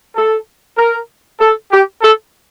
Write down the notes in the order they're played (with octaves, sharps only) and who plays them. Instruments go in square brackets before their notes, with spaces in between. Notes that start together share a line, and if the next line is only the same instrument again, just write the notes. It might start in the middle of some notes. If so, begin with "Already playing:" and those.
[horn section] A4
A#4
A4
G4
A4